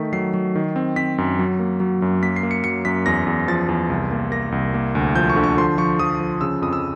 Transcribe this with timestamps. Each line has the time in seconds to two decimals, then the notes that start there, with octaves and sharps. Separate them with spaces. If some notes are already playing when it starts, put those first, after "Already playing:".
Already playing: D#3 A3 B6
0.13 F#3 C7
0.34 F#3
0.55 D#3
0.76 C4
0.96 C4 B6
1.18 F#2
1.39 F#3
1.60 A#3
1.80 F#3
2.02 F#2
2.22 A#3 B6
2.36 C7
2.43 A#3
2.51 C#7
2.64 F#3 C#7
2.85 F#2 B6
3.06 E2 A#6
3.27 E2
3.48 F3 A6
3.68 E2
3.90 C2
4.12 A#3
4.32 A#3 A#6
4.52 C2
4.74 A#3
4.95 D2
5.15 F3 G6
5.29 C#6
5.36 D3
5.44 C#6
5.57 F3 C6
5.78 F3 C#6
5.99 F3 D#6
6.20 F3
6.41 C#3 E6
6.62 F2 D#6
6.73 E6